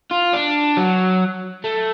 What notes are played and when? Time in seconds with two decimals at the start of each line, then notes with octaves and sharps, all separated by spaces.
0.11 F4
0.33 D4
0.77 F#3
1.64 A3